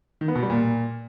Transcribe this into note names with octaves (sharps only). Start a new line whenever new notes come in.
D#3
B3
B2
G3
A#2